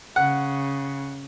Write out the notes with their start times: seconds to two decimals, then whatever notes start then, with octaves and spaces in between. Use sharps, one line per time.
0.16 C#3 F#5